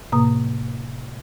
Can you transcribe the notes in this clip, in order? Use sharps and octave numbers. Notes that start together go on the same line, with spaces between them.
A2 C3 A#3 A#5 D#6